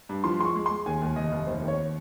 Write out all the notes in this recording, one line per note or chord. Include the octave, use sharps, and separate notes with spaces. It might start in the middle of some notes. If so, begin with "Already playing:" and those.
G2
F3 C6
G#3 C6
C#6
G#3
G#3 C6
D#2 G#5
D#2
F1 D#5
F1
D#2 C5
D#2
C#5